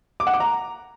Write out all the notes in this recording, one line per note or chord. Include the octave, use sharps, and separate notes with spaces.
D6
F#5
D6
A#5